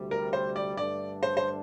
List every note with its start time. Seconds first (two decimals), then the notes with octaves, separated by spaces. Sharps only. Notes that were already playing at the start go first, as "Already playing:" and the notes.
Already playing: D2 C3 G3
0.11 A#4
0.33 C5
0.56 D5
0.77 G2 D3 A3 D4 D5
1.23 C5
1.37 C5